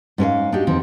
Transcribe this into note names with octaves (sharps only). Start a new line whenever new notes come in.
G#2 C#4 A#4 F5
D4 D#4 F#4 G4
E2 D#3 C4